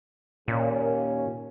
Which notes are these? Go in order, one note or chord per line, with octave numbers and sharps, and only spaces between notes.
D#2 A#2 C#4